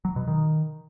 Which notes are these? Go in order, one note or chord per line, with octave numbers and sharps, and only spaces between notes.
F#3
B2
D#3